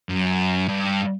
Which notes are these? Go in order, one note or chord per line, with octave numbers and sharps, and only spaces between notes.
F#2
G2